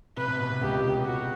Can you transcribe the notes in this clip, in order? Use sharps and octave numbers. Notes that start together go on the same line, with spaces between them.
C3 B4
C3
B2
C3
C#2 C#3 G4
F#4